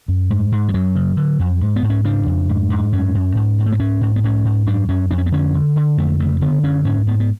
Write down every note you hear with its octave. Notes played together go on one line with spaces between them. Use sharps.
F#2
G#2
G#2
F3
F#2 F#3
C#3
D3
F2
G#2
B3
G#2
C#4
C#3 D4
F2
G#2
G#2
F#2 C#4
F#2
G#2
G#2
A3
B3
G#2 C#4
G#2
B3
G#2 C#4
G#2
F#2 D4
F#2 C#4
F2 D4
C#4
B3
D3 C#4
D3
D3
F2 A3
C#3 A3
D3 B3
F#2 C#4
G#2 C#4
G#2 B3
B3